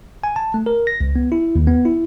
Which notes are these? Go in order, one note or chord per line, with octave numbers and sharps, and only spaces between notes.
G#5
A5
A3
A#4
A#6
C#2
B3
E4
D#2
B3
E4